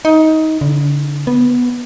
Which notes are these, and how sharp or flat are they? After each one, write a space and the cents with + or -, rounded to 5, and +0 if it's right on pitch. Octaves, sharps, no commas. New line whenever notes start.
D#4 +20
D3 -30
B3 -5